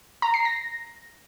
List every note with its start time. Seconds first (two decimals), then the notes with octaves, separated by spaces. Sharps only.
0.22 A#5
0.34 C7
0.45 A#6